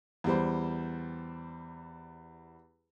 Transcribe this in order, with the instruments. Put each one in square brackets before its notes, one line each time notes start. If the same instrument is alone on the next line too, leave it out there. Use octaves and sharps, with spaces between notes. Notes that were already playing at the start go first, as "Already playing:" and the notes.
[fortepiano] E2 G3 C5